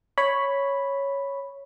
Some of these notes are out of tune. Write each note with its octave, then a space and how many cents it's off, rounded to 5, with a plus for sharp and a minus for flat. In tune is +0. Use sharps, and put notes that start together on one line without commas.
C#5 +0 B5 +0